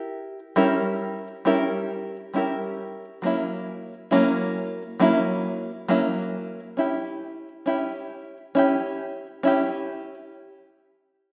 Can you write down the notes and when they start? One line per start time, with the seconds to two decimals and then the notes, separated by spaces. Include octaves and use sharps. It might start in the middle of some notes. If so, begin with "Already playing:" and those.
Already playing: E4 G4 A#4
0.56 G3 C#4 E4 G4 A#4
1.45 G3 C#4 E4 G4 A#4
2.34 G3 C#4 E4 G4 A#4
3.22 F#3 A#3 C#4 E4
4.11 F#3 A#3 C#4 E4
5.00 F#3 A#3 C#4 E4
5.88 F#3 A#3 C#4 E4
6.77 C#4 E4 G4
7.66 C#4 E4 G4
8.55 C#4 E4 G4
9.43 C#4 E4 G4